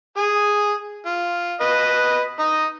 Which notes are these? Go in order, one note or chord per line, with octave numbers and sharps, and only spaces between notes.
G#4 G#5
F4
B4 D#5
D#4 D#5